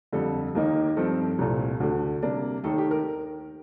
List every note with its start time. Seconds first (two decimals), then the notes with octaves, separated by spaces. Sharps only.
0.12 F2 D3 G3 A4
0.55 D#2 D#3 A#3 D#4
0.97 G2 F3 C4 A4
1.38 C2 A#2 A3
1.80 D2 D3 A3
2.22 C3 G3 A#3 D4
2.64 D#2 D#3 A3 A4
2.78 G4
2.91 A#4